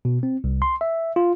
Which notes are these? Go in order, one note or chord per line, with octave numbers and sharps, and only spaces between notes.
B2
C4
C2
C6
E5
F4